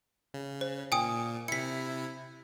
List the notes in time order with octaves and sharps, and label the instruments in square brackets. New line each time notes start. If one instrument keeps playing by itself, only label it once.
[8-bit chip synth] C#3
[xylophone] C5
[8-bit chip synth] A#2 [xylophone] G5 G#5 D#6
[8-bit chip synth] C3 E4 [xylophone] B6 C#7